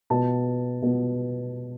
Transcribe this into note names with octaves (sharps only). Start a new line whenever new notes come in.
B2 B3 A5
B2 B3